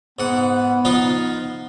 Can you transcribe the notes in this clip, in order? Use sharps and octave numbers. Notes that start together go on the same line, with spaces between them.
G#2 B3 F#5
F3 D#4 F4